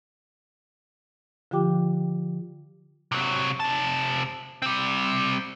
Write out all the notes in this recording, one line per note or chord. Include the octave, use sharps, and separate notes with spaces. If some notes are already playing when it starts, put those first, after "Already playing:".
D3 F3 F4 G4 G5 D6
C3 F#3
C3 A5
G3 C4